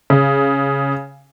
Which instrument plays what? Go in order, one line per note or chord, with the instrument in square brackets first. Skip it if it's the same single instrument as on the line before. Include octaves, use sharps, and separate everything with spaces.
[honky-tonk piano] C#3